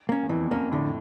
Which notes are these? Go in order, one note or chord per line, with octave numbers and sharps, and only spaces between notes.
A#3 C#4
E2
F2 E3
E2
F2 A#3 C#4
F2 A2 D3